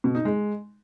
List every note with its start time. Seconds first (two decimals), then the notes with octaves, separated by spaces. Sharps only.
0.04 B2
0.15 D#4
0.25 G#3